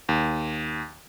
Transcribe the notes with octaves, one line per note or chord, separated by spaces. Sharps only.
D#2